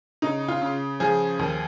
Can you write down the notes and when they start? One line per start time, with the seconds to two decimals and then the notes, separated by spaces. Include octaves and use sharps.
0.22 C#3 D#4
0.48 F4
0.62 C#3
1.00 F3 G#4
1.39 D#2